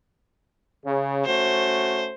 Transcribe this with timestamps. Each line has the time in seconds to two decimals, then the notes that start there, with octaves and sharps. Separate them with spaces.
0.84 C#3
1.26 A3 C#4 F#4 C5